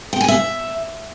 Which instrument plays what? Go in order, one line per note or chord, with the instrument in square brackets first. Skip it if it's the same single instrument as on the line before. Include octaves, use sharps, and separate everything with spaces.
[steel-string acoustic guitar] G5
G#5
E5